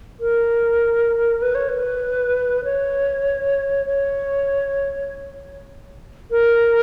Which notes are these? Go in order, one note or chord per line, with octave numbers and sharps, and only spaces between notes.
A#4
B4
C#5
B4
C#5
C#5
A#4